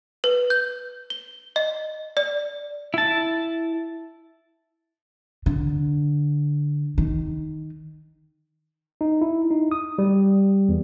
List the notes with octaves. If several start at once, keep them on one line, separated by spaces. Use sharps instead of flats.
B4
G6
G7
D#5
D5
E4 A5
D3
D#3
D#4
E4
D#4
D#6
G3
E2